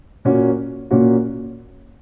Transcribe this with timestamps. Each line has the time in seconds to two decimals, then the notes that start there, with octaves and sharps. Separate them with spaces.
0.25 A#2 A#3 C#4 F#4
0.91 A#2 A#3 C#4 F#4